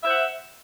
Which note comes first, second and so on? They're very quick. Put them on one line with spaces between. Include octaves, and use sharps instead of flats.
E5 C5 F#5